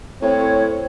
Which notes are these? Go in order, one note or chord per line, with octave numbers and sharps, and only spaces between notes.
A2 C4 C#5